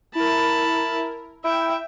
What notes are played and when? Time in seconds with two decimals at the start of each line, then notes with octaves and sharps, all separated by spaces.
0.15 E4 A#4 A5 B5
1.44 E4 E5 G5